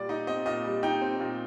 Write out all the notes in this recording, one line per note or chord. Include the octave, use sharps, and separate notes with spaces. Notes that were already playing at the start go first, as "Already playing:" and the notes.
Already playing: A#2 G3 D5
D#4 D#5
C4 D#5
A#2 D#5
G3
D#4 G5
C4
A#2